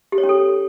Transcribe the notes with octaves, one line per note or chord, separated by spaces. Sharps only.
G4
C#5
C#4
A4